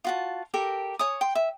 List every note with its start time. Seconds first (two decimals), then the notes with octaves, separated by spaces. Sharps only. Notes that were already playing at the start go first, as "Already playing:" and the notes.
0.04 F4 F#4 A5
0.54 G4 A4 A#4
0.99 C#5 G#5 D#6
1.21 G5 C6
1.35 E5